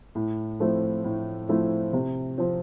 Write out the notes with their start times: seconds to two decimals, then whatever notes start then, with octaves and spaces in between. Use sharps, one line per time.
0.15 A2
0.60 F3 A3 C4 E4
1.04 A2
1.49 F3 A3 C4 E4
1.93 C3
2.38 F3 C4